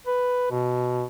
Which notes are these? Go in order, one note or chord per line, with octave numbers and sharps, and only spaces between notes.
B4
B2